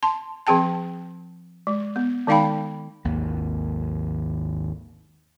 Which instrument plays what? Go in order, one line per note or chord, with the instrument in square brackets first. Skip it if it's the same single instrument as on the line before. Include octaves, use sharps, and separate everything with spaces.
[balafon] A5 C6
F3 C4 G#4 G5 A5
G#3
B3
D#3 G#3 D#4 F5 G5 B5
[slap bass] G#1 D#2 A#3